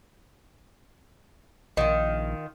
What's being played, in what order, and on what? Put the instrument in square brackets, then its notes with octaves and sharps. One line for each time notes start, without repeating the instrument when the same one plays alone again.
[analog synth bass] A#1 [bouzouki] D#3 F4